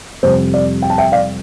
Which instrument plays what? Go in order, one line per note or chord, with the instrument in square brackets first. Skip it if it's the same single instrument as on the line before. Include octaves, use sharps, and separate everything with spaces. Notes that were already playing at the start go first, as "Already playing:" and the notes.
[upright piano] F2 C3 G3 C5
D5
G5
A5
E5 G5
D5 F5